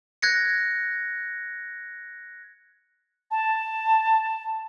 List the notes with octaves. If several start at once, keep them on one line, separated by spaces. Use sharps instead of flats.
F#6 G#6 A#6 C#7
A5